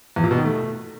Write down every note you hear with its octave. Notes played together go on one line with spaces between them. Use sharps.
E2
A#2
B2
D#3
A3